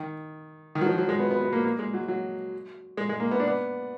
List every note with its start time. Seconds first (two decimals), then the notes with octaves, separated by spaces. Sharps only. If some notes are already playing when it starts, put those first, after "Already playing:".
Already playing: D#3
0.75 D#3
0.81 F#3
0.86 F3
0.98 F#3
1.09 G#3
1.19 B3
1.31 B3
1.41 B3
1.53 A#3
1.65 A#3
1.79 G#3
1.94 F#3
2.08 F#3
2.97 G#3
3.09 G#3
3.20 A#3
3.31 B3
3.39 D4
3.47 B3